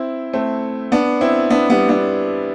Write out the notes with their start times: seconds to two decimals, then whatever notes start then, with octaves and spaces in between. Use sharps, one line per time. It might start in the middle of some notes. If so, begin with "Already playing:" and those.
Already playing: C4 E4
0.33 A3 C4
0.92 B3 D4
1.21 C4 E4
1.50 B3 D4
1.70 G3 B3
1.89 B3 D4